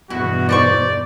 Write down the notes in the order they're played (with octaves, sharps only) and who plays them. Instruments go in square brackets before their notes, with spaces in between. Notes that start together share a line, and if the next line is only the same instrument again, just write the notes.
[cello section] E2 G2 B2 [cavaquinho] E4 [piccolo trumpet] F#4
[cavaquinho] D#4 C5 C#6 [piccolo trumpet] D5